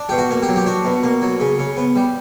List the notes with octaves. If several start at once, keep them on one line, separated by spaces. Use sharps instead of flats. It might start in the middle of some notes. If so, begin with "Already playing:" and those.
Already playing: D4
B2 G4
F#4
A#3
G4
F#3
G4
D4 F#4
B2
A#3
F#3
C#3
C#3
B3
G3